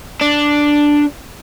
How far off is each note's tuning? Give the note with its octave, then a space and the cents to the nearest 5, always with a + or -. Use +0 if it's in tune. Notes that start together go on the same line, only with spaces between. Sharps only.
D4 +0